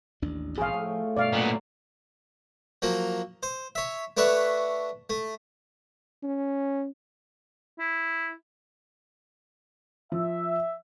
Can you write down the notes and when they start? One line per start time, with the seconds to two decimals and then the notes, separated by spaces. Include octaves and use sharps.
0.22 A1 D#2 D4
0.58 A#1 E2 G#2 F4 G#4 C#5 F5 G5
0.73 A2 F3 A3
1.17 G2 B2 C#5 D5 F5
1.32 A#2 F#3 B3
2.82 F3 F#3 A#3
3.43 C5
3.75 C#5 E5
4.17 A3 D4 B4 C#5 E5 F#5
5.10 A3
6.23 C#4
7.79 E4
10.12 F3 E5